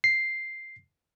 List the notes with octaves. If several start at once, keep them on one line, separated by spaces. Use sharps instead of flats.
C7